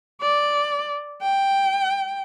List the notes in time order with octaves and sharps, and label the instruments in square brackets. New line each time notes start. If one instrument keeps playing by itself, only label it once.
[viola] D5
G5